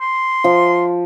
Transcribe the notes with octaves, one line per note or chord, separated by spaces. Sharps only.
C6
F3